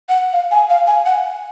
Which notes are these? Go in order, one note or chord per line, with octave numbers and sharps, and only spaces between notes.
F#5
F5
G#5
F5
G#5
F#5